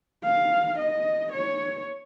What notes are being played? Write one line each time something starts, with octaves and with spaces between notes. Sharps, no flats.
F5
D#5
C#5